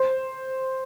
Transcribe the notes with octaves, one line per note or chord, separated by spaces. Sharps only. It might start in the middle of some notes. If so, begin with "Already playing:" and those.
Already playing: C5